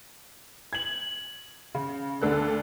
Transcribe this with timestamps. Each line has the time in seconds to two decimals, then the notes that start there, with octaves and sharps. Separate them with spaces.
0.73 G#6 F#7
1.75 C#3
2.22 D2 D3 A4 F#6